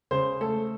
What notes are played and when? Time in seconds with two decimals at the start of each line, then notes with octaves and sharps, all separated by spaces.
0.11 C#3 C5
0.41 A3 A4